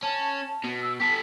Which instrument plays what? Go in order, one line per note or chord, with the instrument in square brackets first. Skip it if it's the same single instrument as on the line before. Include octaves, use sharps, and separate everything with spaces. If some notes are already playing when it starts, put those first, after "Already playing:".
[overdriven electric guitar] C#4 [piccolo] A5
[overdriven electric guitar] B2
[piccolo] E6
[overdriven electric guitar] G4 A4 [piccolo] B6